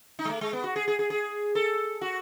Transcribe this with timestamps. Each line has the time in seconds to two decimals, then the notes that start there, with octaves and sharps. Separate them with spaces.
0.19 D#4
0.25 G#3
0.30 A3
0.41 G#3
0.53 B3
0.64 F#4
0.76 G#4
0.88 G#4
0.99 G#4
1.10 G#4
1.55 A4
2.01 F#4